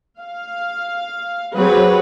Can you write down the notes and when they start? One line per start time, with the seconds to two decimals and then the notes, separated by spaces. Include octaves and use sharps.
0.19 F5
1.56 F#3 C4 G4 G#4 B4 C#5